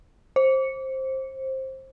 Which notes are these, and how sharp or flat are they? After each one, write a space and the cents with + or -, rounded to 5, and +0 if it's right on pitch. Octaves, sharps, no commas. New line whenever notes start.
C5 +20